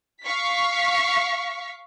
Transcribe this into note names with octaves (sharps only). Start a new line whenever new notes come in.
F5 C#6 B6